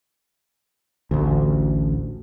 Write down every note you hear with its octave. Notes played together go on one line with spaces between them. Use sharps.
A1 D2